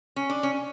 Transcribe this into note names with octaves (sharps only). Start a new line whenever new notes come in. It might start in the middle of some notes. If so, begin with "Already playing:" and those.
C#4
D4
C#4